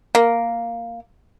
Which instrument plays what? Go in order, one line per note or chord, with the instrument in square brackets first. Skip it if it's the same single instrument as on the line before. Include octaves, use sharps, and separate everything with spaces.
[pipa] A#3